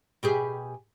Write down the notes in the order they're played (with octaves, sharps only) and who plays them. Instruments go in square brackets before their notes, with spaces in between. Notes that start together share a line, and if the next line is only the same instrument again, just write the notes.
[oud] B2 G4 G#4